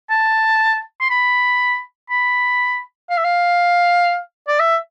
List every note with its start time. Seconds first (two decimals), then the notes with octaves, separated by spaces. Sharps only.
0.10 A5
1.01 C6
1.10 B5
2.10 B5
3.10 F5
3.17 E5
3.24 F5
4.48 D5
4.59 E5